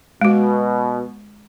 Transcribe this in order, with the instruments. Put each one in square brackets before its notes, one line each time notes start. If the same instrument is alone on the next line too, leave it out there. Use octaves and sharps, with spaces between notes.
[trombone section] B2 [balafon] G#3 F#4